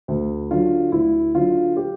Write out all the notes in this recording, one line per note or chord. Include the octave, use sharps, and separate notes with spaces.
D2
D3 F#3 F4
D2 E4
D3 F#3 F4
G4